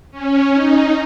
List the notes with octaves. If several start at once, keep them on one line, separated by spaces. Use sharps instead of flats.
C#4
D#4